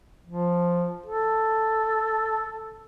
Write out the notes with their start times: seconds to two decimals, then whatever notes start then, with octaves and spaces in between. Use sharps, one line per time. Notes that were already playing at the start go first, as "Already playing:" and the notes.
0.27 F3
1.06 A4